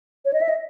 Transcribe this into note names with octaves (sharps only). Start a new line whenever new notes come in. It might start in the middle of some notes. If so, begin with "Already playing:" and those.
C#5
D#5
E5
D#5